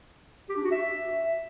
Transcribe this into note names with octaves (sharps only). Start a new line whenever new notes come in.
G4
D4
F#4
E5